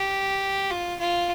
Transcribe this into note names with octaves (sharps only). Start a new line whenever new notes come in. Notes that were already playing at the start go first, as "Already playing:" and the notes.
Already playing: G4
F4
F4